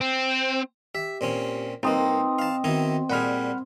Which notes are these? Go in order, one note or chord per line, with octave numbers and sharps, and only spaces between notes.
C4
G4 E5
A#2 C4 C#4
C2 A#3 C4 D#4 B4 D#5
F5 A5
D#3 B3 D#4 E4 F#4
A#2 G3 G#4 F#5 B5 F6